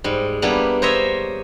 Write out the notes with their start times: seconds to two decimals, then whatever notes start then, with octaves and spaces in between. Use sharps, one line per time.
0.04 G#2 G3
0.42 G3 A#3 B3 D4 E4 G4
0.82 C5 C#5 D#5 E5